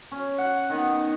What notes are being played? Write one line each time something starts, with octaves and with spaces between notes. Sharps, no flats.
C#4
F#5
D#3 B3